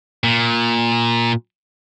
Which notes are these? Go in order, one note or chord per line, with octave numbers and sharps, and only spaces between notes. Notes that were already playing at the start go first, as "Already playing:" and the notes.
A#2